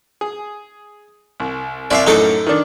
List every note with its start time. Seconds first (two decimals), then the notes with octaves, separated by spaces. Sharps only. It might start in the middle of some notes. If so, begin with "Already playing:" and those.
0.21 G#4
1.40 C2
1.91 C2 D5 E5 F5
2.07 F#2 A2 F#3 D#4 A4 D6
2.47 D#3 D4